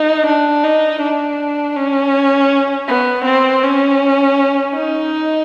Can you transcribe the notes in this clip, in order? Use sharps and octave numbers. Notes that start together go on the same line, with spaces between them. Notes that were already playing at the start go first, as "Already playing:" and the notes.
Already playing: D#4
D4
D#4
D4
C#4
B3
C4
C#4
D#4